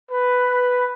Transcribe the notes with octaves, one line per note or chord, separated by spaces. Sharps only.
B4